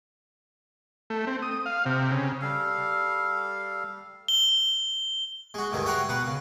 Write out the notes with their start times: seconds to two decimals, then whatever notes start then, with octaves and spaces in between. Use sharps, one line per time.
1.10 A3
1.27 C4
1.42 D#6
1.66 F5
1.86 C3
2.11 C#3
2.42 G3 A4 F5
4.28 G7
5.54 G#3 F#4
5.72 D2 G2 D3 D#3 G#3
5.86 C#5 E5 F#5 G5 A#5 C6
6.09 B2 B4 F#5
6.27 C#3